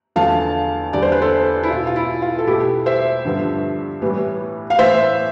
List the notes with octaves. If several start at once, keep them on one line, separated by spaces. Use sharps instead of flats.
E2 D3 F3 A3 F5 A5
E2 D3 G3 D5
C5
B4
A4 C5
E4
B2 B3 F4
F4
E4
F4
A4
B2 A3 E4 G4
C5 E5
G2 D3 F3 B3
A2 E3 G3 B3
F5
A2 E3 B3 C5 E5